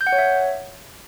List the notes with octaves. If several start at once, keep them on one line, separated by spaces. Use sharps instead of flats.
G6
F#5
C#5
E5